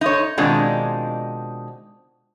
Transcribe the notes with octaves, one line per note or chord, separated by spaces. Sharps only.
D#4 C#5
B2 D#3 G#3 C4 D4 F4